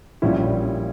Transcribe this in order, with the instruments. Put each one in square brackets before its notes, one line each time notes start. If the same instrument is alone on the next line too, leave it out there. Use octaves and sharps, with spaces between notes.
[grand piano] A#1 A#2 G3 C#4 E4